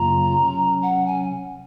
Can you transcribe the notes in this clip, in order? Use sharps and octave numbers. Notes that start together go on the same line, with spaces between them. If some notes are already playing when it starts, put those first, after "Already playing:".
Already playing: F#2 C#3 F#3 A#3 F4 A#5
C3 F#3 C#4
F#5
G#5